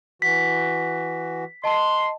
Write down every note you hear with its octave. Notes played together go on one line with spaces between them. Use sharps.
E3 F#4 B6
D#5 A5 C6